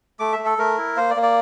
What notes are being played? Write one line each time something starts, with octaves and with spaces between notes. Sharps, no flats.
A3 D6
E5
A3
A4
A3 A#4
E4
A#3 C5
D5
A#3
D5